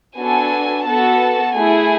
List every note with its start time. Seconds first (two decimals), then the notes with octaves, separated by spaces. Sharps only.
0.17 B3 D4 F#4 A4 G#5
0.86 B3 F#4 A4 A5
1.54 A3 E4 G#4 G#5